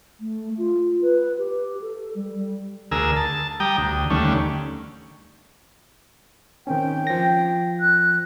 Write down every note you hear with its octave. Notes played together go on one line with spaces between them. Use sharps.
A3
F4
B4
G4
A4
G3
G3
D2 G#4 A#4 E6
A5
G3 G5 A#5 D#6
D2
D#2 D3 G3 A3 C#4
D#3 C4 C#4 G5
F3 A#6
F#6